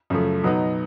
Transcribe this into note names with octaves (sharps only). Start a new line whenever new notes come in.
F#2 C#3 F3 A3
B2 F#3 B3 D#4